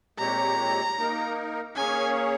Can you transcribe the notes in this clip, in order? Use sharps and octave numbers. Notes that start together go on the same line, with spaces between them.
A#2 G#3 C4 G4 C#5 A#5
A#3 D#4 A#4
A#3 C#4 G#4 C#5 G#5